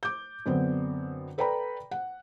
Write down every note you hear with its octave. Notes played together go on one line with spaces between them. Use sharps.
D6 G6
F#2 D3 B3 C4
A4 B4 D5 G5 A#5 B5
F#5